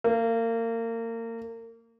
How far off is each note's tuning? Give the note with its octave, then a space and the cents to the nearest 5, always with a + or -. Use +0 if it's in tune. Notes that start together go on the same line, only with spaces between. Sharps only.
A#3 -30